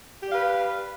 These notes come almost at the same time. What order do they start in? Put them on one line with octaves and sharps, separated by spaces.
G4 D5 F5 B4